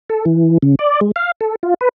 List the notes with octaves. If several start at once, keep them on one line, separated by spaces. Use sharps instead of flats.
A4
E3
C#3
D5
G#3
F5
A4
F4
B4